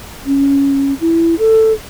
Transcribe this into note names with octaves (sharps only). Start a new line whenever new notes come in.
C#4
E4
A4